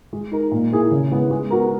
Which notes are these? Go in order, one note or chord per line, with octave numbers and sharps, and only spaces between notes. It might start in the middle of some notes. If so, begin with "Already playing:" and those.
G#3
D#4 A#4
A#2
A#3 E4 G#4
C#3
G#3 B3 E4
G#3
B3 F#4 A#4